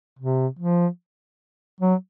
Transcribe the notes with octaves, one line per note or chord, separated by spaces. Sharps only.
C3
F3
F#3